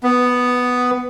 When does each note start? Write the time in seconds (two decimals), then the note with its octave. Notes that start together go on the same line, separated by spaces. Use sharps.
0.03 B3